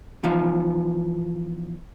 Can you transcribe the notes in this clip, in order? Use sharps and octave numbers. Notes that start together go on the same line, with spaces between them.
B2 E3 F3 D#4 F4 F5